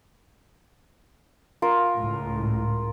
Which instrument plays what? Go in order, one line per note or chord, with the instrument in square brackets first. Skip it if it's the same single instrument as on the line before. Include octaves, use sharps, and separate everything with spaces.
[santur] F4 A#4
[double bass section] C#2 A2